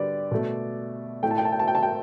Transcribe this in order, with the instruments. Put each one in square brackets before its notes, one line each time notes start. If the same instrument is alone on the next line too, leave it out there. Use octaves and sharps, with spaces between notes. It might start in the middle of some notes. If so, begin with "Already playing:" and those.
Already playing: [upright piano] D3 G3 G4 B4 D5
B2 A3
A2 A3 G5
A5
G5
A5
G5
A5
G5
A5
G5